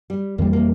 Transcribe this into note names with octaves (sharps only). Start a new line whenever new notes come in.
G3
F2 E3 G3 A#3
A#3